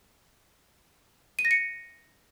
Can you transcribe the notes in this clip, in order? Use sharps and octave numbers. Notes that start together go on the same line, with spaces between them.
D#7
A#6
C#7